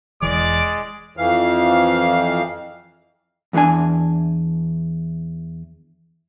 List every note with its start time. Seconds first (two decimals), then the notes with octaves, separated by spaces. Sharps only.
0.22 E1 E3 G#3 D5 D6
1.17 F2 E3 F5
3.53 E2 E3 F#3 D4 G#5